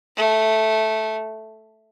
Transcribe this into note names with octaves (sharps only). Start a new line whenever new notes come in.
A3